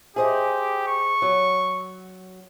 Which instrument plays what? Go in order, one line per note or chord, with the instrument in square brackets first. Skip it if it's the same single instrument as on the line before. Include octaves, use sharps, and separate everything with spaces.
[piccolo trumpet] G4 [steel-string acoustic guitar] G#4 C5 D#5
[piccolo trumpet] C#6
[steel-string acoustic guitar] F#3